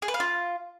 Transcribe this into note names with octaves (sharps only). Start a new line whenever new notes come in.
G#4
B4
F5
F4